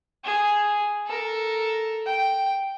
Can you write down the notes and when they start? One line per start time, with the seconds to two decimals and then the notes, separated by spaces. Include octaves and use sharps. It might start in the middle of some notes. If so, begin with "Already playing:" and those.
0.24 G#4
1.07 A4 A#4
2.06 G5